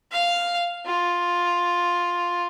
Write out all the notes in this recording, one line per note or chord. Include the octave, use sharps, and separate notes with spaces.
F5
F4